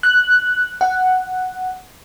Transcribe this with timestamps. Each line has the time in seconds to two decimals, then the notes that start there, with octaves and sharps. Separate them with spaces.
0.03 F#6
0.81 F#5